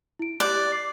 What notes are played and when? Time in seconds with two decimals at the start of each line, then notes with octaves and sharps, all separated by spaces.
0.19 E4 D7
0.40 G4 D5 F#6 G6
0.69 D6 C7